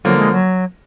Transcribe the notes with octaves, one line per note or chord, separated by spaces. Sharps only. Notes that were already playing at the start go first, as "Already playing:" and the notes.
D3 F3 F#3 A#3
G#3
F#3